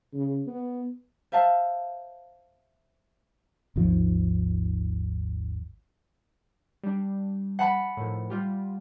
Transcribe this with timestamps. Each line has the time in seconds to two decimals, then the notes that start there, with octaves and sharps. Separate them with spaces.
0.13 C#3
0.47 B3
1.32 C5 E5 F5 A5
3.76 G#1 D#2 F3
6.84 G3 D4
7.59 F#5 A5 B5
7.97 A2 D#3 F3
8.30 G3 F4 G4